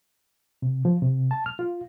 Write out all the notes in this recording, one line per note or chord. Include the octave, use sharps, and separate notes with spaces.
C3
F3
C3
A5
F6
F4